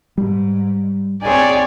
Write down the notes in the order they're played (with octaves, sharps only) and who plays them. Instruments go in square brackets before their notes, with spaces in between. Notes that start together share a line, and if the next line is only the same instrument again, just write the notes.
[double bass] G#2 [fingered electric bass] G3
[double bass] C4 D#4 [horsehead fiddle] G#4 G#5 [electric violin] C#5 D5